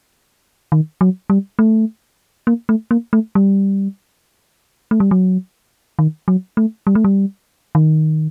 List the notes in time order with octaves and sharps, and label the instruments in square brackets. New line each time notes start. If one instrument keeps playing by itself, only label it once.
[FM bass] D#3
F#3
G3
A3
A#3
A3
A#3
A3
G3
A3
G3
F#3
D#3
F#3
A3
G3
A3
G3
D#3